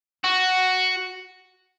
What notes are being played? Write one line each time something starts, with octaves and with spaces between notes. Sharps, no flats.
F#4